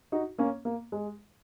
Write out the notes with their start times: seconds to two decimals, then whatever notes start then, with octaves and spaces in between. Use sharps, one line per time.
0.12 D#4 F#4
0.38 A#3 C#4
0.65 A#3
0.92 G#3